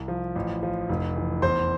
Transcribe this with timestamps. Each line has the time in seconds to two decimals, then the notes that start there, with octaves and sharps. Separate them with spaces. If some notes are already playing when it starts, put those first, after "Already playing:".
Already playing: C2
0.08 F3
0.36 A1
0.63 F3
0.89 F1
1.16 E3
1.42 E2 C5 C6